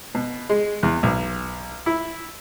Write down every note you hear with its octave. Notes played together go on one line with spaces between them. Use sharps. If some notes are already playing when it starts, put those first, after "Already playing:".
B2
G#3
E2
B1
E4